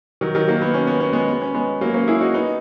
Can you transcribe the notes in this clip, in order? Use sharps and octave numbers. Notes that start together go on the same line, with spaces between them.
D#3 F#3
D#3 F#3
F#3 A#3
B3
C#4
B3
C#4
G#3 B3
B3
C#4
G#3 B3
F#3 A#3
A#3 C#4
E4 G#4
D#4 F#4
B3 D#4